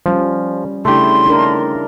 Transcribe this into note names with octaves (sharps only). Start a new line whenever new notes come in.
F3 G3 C#4
C#3 A3 D4 E4 G4 C6
D4 D#4 A#4